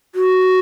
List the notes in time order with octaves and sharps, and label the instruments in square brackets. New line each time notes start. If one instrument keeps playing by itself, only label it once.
[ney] F#4